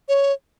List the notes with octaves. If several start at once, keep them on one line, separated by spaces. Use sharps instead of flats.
C#5